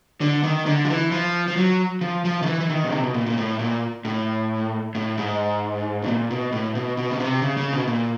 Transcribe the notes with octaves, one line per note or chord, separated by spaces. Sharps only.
D3
D#3
D3
F3
E3
F3
F3
F#3
F3
F3
D#3
E3
E3
D#3
B2
C3
B2
A#2
A#2
A2
A#2
A2
A2
G#2
B2
A#2
B2
A2
B2
B2
C#3
C3
C#3
C#3
B2
A#2